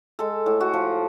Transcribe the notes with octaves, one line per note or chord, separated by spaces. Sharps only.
G#3 A4
A2
F#4
F3